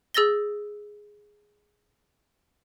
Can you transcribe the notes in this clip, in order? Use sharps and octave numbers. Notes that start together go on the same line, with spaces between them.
G#4 E6 A6 A#6 G7